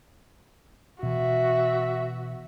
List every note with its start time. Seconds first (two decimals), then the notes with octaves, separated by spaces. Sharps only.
1.03 B2 E3 F#4 E5